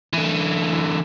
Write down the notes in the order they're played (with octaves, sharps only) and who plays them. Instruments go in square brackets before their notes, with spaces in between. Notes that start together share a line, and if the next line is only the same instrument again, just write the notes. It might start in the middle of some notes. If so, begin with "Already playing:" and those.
[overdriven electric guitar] D3 E3